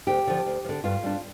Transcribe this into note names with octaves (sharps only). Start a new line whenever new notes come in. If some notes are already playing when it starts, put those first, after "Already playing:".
D2 G4
D3 F3
D2
F3
D3
G2 F4
G3 D4